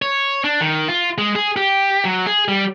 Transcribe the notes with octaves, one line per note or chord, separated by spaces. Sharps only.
C#5
D4
D#3
F4
G#3
G#4
G4
F#3
G#4
G3